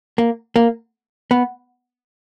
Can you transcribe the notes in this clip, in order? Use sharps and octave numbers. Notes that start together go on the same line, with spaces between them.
A#3
A#3
B3